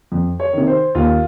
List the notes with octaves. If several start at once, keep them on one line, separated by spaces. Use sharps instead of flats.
F2
C#5
C3 D#3
C5
D#2 F4